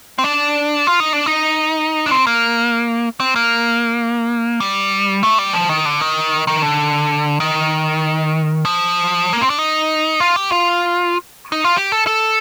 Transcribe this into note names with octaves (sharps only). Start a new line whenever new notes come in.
C4
D4
F4
D#4
D4
D#4
D4
C4
A#3
C4
A#3
G3
A3
G3
F3
D#3
D3
D#3
D#3
D3
D#3
F3
A#3
C4
D4
D#4
F4
G4
F4
D#4
F4
G4
A4
A4